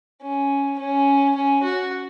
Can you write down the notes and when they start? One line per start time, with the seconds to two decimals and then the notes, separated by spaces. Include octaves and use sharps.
0.22 C#4
0.79 C#4
1.35 C#4
1.63 F#4